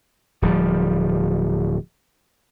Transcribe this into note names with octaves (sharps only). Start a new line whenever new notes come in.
D1 F3 G3